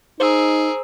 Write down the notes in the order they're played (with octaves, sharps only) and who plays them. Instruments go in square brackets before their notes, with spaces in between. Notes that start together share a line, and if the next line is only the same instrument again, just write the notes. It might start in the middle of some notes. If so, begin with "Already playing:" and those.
[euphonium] D#4 [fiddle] G#4 A#4 [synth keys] C5 E6